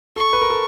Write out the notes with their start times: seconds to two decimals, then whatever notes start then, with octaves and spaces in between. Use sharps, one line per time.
0.16 A4 C#6
0.33 B4
0.42 A#4
0.50 A4